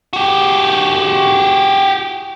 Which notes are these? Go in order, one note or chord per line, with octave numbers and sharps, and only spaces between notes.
F#4 G4